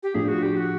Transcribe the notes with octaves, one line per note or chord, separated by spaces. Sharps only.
G4
A2 F3 A3 D4 F4 G#4
F#4
G4
F#4